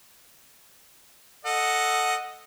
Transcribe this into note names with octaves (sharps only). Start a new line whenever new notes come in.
A4 D#5 F#5